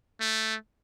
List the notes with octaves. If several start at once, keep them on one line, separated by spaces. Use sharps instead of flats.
A3